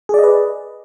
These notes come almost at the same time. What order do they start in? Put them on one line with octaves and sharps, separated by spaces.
G#4 D5 D#5 B4